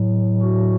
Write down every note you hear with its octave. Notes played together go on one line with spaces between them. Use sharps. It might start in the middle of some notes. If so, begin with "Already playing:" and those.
Already playing: A2 F#3
F#4